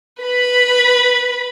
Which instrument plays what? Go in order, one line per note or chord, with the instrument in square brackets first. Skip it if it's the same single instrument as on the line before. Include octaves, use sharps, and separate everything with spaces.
[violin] B4 B5